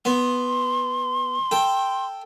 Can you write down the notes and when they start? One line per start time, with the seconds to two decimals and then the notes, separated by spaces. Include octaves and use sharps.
0.05 B3 C6
1.51 A4 G5